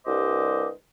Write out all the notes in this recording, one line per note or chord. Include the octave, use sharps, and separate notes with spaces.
C2 G2 C5 D#5 D6